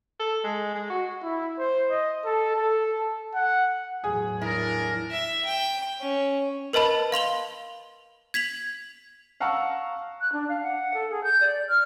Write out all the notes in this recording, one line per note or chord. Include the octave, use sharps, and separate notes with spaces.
A4
G#3
G#3
F#4
E4
C5
D#5
A4
A4
A4
F#5
E2 A2 F#3 G#4
D4 E4 A#4
E5
G5
C#4
A#4 B4 D#5 A5 B5
F5 C6 F7 G7
G#6 B6 F7 F#7
F5 F#5 A5 A#5 C#6 E6
F#6
D4
F5
F#5
A4
G#4
G6
D5
F6